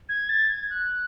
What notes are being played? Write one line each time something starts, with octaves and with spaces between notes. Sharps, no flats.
G#6
A6
G#6
F#6